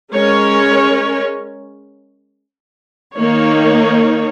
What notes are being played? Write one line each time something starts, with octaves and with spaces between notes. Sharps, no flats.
G#3 C#4 A#4 C#5
D#3 A#3 D#4 C#5